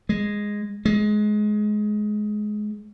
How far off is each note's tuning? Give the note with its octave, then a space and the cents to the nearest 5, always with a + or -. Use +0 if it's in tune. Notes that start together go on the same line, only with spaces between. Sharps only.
G#3 -5
G#3 +20